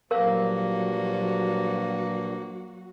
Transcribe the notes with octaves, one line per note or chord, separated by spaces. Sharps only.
G2 A#2 F3 F#3 A#3 F#4 A#4 F5